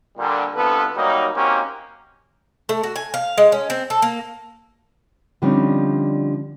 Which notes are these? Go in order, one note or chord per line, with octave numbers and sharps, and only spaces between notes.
A#2 D3 G3
C2 D3 B3 F4 A4 B4
F#3 G3 A#3 D#4
A#3 C4 C#4 D#4 F#4 G4
A3
F#4
G#5
F5
G#3
C#4
C4
A4
A#3
D3 F3 G3 C4 C#4 D#4